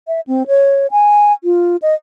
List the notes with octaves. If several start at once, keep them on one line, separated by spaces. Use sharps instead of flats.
E5
C4
C#5
G#5
F4
D#5